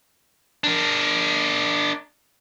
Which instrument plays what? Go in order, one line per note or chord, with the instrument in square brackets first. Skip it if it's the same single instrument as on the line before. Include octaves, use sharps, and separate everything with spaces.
[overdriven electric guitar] D4 A#4